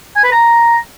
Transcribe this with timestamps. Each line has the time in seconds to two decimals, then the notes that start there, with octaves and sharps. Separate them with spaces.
0.16 G#5
0.24 B4
0.32 A#5